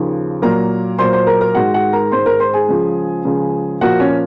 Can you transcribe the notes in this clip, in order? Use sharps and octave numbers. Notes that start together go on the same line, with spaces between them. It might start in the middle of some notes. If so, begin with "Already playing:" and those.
Already playing: D#2 C#3 F3
A#2 F#3 A#3 A#4 A#5
A#2 F#3 A#3 C5 C6
C5 C6
A#4 A#5
A#4 A#5
G#2 D#3 G#3 F#4 F#5
F#4 F#5
A#4 A#5
G#2 D#3 G#3 C5 C6
A#4 A#5
C5 C6
G#4 G#5
C#2 C#3 F3
C#2 C#3 F3
A#2 F3 A#3 F#4 F#5
C#4 C#5